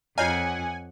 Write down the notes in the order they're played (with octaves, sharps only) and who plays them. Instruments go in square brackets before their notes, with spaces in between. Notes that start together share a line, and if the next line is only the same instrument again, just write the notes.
[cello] F2 F#5 [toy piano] F4 C#5 D#5 [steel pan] F5 A#5 [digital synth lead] G#5